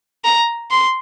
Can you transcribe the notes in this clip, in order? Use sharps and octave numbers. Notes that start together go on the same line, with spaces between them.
A#5
C6